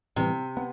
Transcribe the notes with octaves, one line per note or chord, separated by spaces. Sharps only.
A2 C3 E3 G3 B3
B3